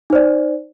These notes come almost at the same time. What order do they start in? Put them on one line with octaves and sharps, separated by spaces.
D#4 C5 D5